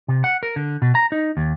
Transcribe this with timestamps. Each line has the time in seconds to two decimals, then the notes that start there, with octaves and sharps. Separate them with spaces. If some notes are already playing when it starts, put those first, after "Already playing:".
0.08 C3
0.24 F#5
0.43 A#4
0.56 D3
0.82 B2
0.95 A#5
1.12 D#4
1.37 D#2